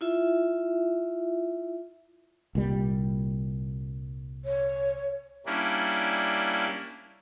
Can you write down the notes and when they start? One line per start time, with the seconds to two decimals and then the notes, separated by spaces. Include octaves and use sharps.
0.01 E4 F4 E5
2.55 C2 A#2 G3
4.45 C#5
5.46 G3 A#3 C#4 D4 E4